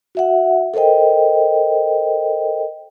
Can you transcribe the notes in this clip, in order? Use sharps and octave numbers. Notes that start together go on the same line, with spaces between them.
F#4 E5 F#5
A4 A#4 C5 D#5 G5